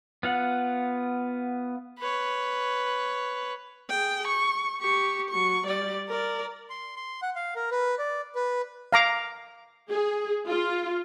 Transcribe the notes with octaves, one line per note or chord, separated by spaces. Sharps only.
B3 F4 F#5
B4 C#5
G#4 G5
C#6
G4 C#6
F#3 C#6
G3 D5
A#4 D5
C6
C6
F#5
F5
A#4
B4
D5
B4
F5 A#5 D6
G#4
F4